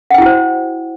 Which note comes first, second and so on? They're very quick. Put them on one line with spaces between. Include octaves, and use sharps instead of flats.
F#5 G5 E4 F#4 C5